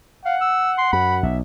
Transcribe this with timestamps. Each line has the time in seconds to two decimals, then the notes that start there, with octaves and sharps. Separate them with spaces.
0.25 F5 F#5
0.41 E6
0.78 C6
0.93 F#2 B5
1.23 B1 E5